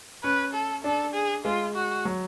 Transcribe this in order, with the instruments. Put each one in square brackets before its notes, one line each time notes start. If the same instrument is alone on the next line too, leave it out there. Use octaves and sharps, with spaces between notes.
[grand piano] C#4 [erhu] B4
[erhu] A4
[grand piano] D4 [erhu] A4
[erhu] G#4
[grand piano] G#3 [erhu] F4
[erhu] F#4
[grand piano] F#3